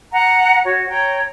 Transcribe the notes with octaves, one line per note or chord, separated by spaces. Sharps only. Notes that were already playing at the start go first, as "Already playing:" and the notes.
F#5 A#5
F#4 C#5
C#5 G5 A#5